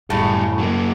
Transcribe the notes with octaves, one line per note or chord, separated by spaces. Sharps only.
F#2 A2 C#3 G3 A4
F#3 A#3